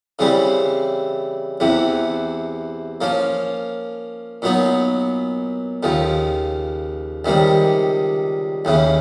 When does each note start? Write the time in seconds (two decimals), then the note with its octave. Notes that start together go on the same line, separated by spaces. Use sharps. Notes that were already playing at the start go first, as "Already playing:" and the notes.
0.19 C#3 E3 G3 C4
1.60 E2 C3 E3
3.01 F3 A#3 C#4
4.42 A#2 F#3 B3 D#4
5.83 D#2 C#3 F3
7.25 C#2 C3 D#3 G3
8.65 D#2 C#3 E3